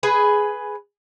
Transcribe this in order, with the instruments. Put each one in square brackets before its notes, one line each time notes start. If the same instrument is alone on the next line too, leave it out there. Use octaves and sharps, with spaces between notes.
[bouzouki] G#4 B4 G#5